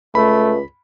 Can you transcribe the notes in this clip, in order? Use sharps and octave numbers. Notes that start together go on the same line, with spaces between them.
C#2 A3 B5